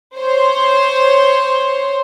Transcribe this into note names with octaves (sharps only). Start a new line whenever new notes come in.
C5 C#5 C6